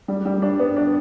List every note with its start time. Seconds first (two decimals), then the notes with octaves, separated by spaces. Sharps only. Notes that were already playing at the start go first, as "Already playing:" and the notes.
0.08 G3
0.25 G3
0.42 D4
0.60 B3
0.76 D4